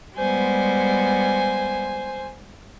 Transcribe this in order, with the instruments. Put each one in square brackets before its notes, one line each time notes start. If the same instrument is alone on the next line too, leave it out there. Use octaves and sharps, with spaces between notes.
[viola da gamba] G3 G#3 B3 [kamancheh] C5 G#5